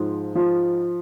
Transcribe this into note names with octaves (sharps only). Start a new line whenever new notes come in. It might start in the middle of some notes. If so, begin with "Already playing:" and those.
Already playing: G#2 F3
F3